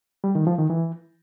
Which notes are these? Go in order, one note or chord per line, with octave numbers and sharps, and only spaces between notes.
G3
D#3
F3
D#3
E3